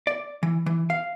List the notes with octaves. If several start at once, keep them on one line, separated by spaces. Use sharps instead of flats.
D5
E3
E3
F5